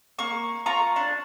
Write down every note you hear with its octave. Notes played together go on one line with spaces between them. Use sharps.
A#3 C#6
F4 A#5 C#6
D4